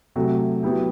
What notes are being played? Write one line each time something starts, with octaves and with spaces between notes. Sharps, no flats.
C3 F#3 A3
F#3 B3 E4 G4